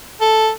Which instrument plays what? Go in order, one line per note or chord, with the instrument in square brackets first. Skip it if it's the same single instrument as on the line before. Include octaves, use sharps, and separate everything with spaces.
[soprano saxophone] A4